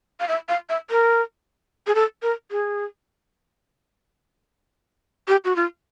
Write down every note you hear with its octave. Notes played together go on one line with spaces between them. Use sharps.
F5
E5
F5
E5
A#4
G#4
A4
A#4
G#4
G4
F#4
F4